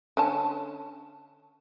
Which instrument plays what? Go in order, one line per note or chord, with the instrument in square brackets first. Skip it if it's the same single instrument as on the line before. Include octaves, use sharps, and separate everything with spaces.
[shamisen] D3 C#4 A5